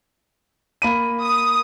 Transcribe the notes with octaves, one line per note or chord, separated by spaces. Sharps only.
A#3 B5 D#7
D#6